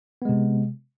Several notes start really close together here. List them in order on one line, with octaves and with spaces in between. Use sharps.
B3 G#3 C3